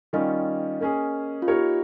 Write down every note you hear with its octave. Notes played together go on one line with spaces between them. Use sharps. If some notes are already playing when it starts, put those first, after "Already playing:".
D#3 G3 C#4 F4 D#5
A#3 C#4 G#4
F4
A#3 D#4 G4 A#4 C#5